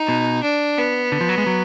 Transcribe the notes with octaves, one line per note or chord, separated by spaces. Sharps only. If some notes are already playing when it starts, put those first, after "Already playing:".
Already playing: D#4
B2
D4
B3
D3
F3
F#3
G#3
F#3